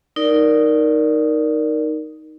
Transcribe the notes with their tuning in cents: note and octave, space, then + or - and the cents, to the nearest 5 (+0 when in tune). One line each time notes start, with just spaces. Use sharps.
D#4 +0 A#4 +0 D5 +0